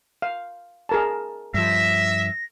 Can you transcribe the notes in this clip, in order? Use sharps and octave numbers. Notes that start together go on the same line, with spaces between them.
F5
G#4 A#4 A5
G2 F3 E5 A#6